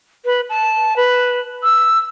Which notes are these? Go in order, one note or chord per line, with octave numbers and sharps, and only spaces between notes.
B4
A5
B4
E6